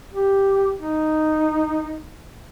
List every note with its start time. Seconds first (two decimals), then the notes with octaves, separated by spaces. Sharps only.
0.12 G4
0.78 D#4